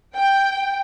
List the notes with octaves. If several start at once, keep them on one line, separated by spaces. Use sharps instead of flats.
G5